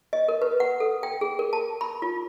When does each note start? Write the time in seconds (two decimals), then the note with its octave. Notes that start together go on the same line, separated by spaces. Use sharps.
0.13 D#5
0.28 A#4
0.42 B4
0.60 F#5
0.80 A4
1.03 G5
1.21 G#4
1.39 A#4
1.53 A5
1.81 B5
2.02 F4